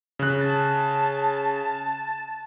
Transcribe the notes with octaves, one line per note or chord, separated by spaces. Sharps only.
C#3 F#6
A5